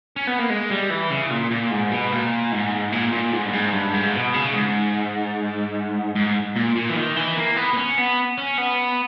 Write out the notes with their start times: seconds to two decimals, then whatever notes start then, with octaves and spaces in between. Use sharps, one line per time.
0.16 C#4
0.27 B3
0.39 A#3
0.50 G#3
0.70 G3
0.90 E3
1.11 C#3
1.31 A#2
1.51 A#2
1.71 G#2
1.91 B2
2.12 A#2
2.52 G#2
2.92 A#2
3.12 A#2
3.33 G#2
3.46 G2
3.53 G#2
3.73 G2
3.94 G#2
4.14 B2
4.34 C#3
4.54 G#2
6.15 G#2
6.56 A#2
6.76 A#2
6.90 E3
6.96 D#3
7.17 E3
7.37 A#3
7.57 B3
7.73 B3
7.77 C#4
7.98 B3
8.38 C#4
8.58 B3